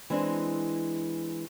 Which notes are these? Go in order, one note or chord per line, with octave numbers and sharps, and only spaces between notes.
E3 G#3 C4 D4